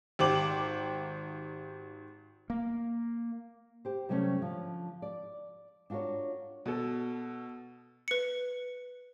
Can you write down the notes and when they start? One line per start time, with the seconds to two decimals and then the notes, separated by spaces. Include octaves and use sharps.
0.19 G#1 G4 C5 D6 F#7
2.50 A#3
3.85 G4 C5
4.09 C3 F#3 G3 A3 C4 C#4
4.38 D3 F3
5.02 D5
5.90 D4 F4 F#4 A#4 C#5
6.66 B2 A4
8.08 B4 C#7